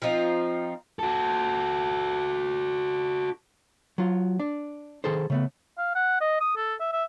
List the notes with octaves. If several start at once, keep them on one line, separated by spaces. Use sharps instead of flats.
F3 C4 D#4 F4
F#4 A4
F#3 F4
D4
D#3 G#4 A4 C5
C#3 A3 B3
F5
F#5
D#5
D#6
A4
E5
E5